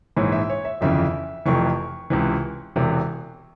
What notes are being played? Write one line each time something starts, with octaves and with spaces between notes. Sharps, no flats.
A#1 G#2 E3 C#5
E5
C#5
E5
G1 F2 C#3 E3 E5
F1 F2 C3 E3 C#6
C#2 C3 E3
E1 E2 C3 E3